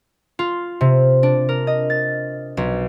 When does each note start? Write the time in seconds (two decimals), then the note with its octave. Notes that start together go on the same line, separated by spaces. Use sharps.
0.39 F4
0.81 C3
1.23 D4
1.49 A#4
1.67 D#5
1.90 A6
2.57 B1